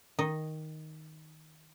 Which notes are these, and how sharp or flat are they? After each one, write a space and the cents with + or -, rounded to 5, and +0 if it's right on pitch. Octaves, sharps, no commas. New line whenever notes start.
D#3 +5 D#5 +0